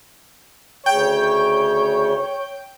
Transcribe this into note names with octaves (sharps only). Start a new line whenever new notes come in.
D2 C#3 C#5 G5 G6